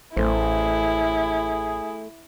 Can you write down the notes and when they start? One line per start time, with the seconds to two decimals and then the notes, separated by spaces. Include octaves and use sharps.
0.16 A1 A3 E4 G#4 C5